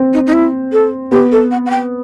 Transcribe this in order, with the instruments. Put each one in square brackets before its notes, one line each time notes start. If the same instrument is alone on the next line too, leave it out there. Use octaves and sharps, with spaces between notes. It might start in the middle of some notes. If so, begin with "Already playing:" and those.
Already playing: [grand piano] C4
[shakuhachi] D#4
D#4
E4
A4
[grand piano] B3 [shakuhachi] G4
[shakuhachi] A4
F#5
F#5
G5